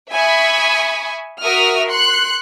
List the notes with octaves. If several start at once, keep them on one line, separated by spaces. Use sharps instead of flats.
E5 G#5 B5 C#6 D#6
F#4 A#4 E5 D#6 F6
C6 F#6 C#7